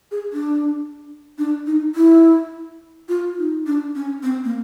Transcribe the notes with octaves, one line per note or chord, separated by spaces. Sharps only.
G#4
D4
D4
D#4
E4
F4
D#4
D4
C#4
C4
A#3